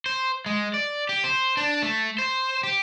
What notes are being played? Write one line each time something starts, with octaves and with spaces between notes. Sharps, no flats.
C5
G#3
D5
G4
C5
D4
A3
C5
G4